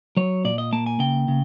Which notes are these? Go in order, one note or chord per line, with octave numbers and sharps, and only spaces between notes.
F#3 C#5
A#2 D5
D#5
A#3 A5
G#5
C#3 G5
C#3